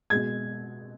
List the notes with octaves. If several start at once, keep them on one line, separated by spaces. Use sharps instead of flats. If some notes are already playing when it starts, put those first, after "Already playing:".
B2 G#3 G#6